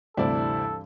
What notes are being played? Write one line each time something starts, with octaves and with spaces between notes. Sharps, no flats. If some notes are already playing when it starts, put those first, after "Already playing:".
D2 G2 C3 E3 C4 E4 A4 D5